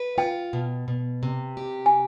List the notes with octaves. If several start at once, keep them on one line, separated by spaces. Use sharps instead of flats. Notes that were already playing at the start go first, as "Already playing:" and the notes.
Already playing: B4
F4 G5
B2
B2
C3
G4
G#5